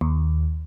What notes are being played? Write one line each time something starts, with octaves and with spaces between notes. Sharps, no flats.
D#2